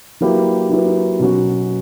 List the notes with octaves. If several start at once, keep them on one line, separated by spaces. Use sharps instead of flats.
F#3 A#3 E4 G4 B4
F#3 A#3 E4 G4 B4
B2 F#3 C#4 F#4